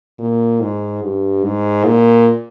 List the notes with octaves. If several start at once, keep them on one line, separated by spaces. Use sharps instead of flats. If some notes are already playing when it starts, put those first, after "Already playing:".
A#2
G#2
G2
G#2
A#2